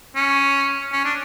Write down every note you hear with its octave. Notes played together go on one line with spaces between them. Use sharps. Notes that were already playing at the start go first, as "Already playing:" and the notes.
C#4
C#4
D4